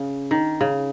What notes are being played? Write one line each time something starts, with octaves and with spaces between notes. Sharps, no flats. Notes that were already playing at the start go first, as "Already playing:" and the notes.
Already playing: C#3
D#3
C#3